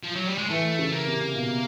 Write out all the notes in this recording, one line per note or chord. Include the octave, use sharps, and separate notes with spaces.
F3
F#3
G3
G#3
E3 A3
C#3
A#3
C3
B2